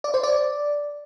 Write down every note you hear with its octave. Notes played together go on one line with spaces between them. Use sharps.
D5
C5
D5